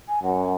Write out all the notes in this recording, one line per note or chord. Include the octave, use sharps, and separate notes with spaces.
G#5
F#2 F#5